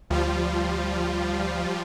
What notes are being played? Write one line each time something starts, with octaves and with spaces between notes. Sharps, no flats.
D2 F3 G3 F4